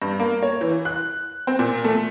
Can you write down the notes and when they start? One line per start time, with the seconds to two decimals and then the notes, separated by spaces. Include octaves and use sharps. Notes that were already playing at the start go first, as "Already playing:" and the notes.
0.02 G2
0.20 A#3
0.43 C#5
0.61 E3
0.85 F#6
1.47 C4
1.59 A#2
1.84 A3